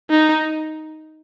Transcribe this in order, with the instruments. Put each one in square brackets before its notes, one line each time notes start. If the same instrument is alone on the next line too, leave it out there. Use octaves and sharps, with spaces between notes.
[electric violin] D#4